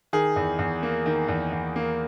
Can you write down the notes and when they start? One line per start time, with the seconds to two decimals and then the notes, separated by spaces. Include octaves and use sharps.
0.13 D#3 G#4
0.36 E2
0.59 E2
0.83 A#3
1.06 D#3
1.28 E2
1.53 E2
1.76 A#3